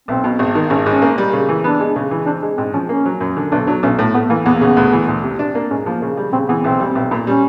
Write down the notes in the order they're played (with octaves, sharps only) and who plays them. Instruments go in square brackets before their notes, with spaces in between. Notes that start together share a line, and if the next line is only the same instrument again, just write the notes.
[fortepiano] B1 [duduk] C4
[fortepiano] B2
G#1
D#3
[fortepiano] G#1 [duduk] C#4
[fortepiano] G#2 [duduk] C#4
[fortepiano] A#3
G3
C#3
E3
[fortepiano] B3 [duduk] D4
[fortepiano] G#3
C#3
E3
[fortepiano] C4 [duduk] D4
[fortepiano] G#3
[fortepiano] G#2 [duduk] C4
[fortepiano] F3 [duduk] C#4
[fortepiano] A#3 [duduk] C#4
[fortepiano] F#3
F#2
D3
[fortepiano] B1 [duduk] D4
[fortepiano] F#3 [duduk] D4
[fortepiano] B1 [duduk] C#4
[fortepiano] A2
[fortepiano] A3 [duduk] B3
[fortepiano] E3 [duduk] A#3
[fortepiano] E2 [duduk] B3
[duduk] A#3
[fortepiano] C#3 [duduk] B3
[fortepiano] D2
E3
D2
C3
D4
A#3
[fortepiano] G#2 [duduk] C#4
[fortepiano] F3 [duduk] A#3
[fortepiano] C#3
G3
[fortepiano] C#3 [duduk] C4
[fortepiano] E3 [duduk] B3
[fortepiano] B1 [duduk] C4
[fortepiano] G3
B1
A#2
[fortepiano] G3 [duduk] C#4